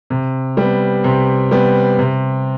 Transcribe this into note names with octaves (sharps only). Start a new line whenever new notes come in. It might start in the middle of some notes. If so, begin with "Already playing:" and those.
C3
G3 B3
C3
G3 B3
C3